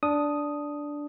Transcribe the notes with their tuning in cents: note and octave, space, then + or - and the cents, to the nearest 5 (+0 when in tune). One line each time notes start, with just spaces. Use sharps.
D4 -5 D#6 +0